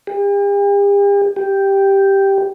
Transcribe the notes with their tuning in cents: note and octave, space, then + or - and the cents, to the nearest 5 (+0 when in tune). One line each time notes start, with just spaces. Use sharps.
G4 +45
G4 +0